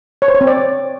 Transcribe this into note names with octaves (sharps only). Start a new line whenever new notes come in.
C#5
C5
C#5
C4
D5